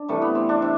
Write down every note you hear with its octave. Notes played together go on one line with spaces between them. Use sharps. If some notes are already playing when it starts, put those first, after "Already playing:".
Already playing: D4
C3 E3 G3 A3
B3
C4
D4
C3